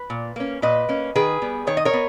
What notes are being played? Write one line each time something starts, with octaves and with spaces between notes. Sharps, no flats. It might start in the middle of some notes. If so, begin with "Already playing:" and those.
Already playing: B4
A#2
A#3 C#4
A#2 B4 D#5
A#3 C#4
D#3 G#4 B4
G3 B3
D#3 C#5
D#5
A#4 C#5
B3